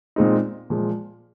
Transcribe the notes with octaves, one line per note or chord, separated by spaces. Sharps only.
A#2 G#3 C4 D#4
A#2 F3 G#3